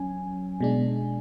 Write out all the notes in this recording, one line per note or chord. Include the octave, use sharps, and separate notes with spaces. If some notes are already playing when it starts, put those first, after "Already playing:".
Already playing: F#3 C#4 G#5
B2 G#3 D4